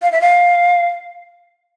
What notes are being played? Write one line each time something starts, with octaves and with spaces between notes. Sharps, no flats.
F5
E5
F5